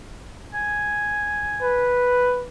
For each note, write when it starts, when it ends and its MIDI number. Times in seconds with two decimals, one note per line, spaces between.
0.54 1.91 80
1.62 2.47 71